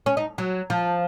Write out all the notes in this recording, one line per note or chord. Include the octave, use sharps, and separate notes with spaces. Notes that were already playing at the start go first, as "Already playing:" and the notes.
C#4
D#4
F#3
F3